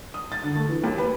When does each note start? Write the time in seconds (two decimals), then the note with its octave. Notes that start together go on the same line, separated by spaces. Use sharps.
0.14 D#6
0.32 A6
0.44 D3
0.55 A3
0.69 E3
0.84 D#2
0.98 B4